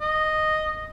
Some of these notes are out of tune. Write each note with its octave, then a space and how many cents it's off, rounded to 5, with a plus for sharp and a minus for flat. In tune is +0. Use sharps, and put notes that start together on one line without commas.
D#5 -5